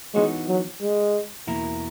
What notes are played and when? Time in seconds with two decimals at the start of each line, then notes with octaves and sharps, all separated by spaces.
0.14 E3 G#3 B3 D#4 F#4 C#5
0.48 F#3
0.81 G#3
1.47 E2 B2 A#3 E4 A#4